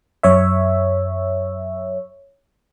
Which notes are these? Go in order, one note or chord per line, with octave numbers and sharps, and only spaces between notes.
F#2 C#5 E5